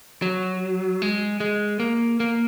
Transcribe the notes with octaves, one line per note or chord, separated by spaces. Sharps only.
F#3
G#3
G#3
A#3
A#3